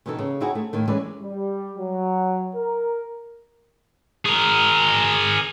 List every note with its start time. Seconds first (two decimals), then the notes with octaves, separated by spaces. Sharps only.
0.06 B2 D#3 E3 D#4 A4
0.19 C#3
0.40 C4 C#4 D#4 E4 F#4 G#4
0.55 A3
0.73 D#2 A2 D#3
0.88 E3 G#3 C#4 B4 D5
1.22 G3
1.78 F#3
2.56 A#4
4.25 G#4 A#4